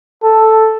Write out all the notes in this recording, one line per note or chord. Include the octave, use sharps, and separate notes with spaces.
A4